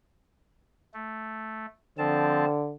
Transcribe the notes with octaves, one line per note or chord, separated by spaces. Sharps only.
A3
D3 F3 C4 A5